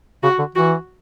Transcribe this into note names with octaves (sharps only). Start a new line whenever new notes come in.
C#3 F#4
D3
E3 F#4